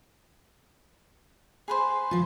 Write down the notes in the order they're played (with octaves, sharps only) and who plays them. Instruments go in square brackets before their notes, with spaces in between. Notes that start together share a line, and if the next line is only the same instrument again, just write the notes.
[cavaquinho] G#4 B4 C5
[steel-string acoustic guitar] F3 F4